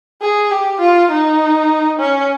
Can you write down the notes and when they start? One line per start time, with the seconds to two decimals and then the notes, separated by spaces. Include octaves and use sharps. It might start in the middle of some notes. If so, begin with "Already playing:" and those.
0.21 G#4
0.51 G4
0.81 F4
1.11 D#4
1.99 C#4